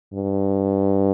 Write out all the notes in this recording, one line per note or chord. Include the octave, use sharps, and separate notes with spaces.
G2